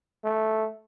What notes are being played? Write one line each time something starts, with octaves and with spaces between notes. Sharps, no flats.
A3